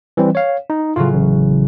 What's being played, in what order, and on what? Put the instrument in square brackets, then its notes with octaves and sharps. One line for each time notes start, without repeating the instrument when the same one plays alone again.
[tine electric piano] E3 G3 C4
C#5 F5
D#4
[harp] A2 C#3 F#3 [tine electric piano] F4
[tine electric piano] A1